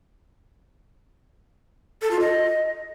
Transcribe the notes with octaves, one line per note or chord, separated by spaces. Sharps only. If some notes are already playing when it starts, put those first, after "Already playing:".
A4
F4
D#5